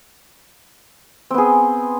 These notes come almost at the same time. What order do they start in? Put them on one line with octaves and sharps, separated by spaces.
C4 B3 G#4